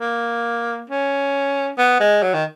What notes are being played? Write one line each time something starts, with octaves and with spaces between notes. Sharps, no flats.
A#3
C#4
B3
G#3
F#3
D#3